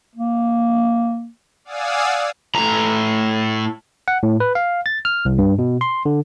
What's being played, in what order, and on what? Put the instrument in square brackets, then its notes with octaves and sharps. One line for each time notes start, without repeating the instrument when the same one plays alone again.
[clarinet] A#3
[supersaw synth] D5 F5 F#5 G#5 D#6 E6
[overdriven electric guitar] A2 A#5
[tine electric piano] F#5
A2
B4
F5
A6
F6
C2
G2
B2
C6
D3